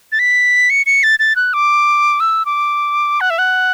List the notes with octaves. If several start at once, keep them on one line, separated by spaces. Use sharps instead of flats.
A6
B6
C#7
C#7
A6
A6
F#6
D6
E6
D6
F#5
E5
F#5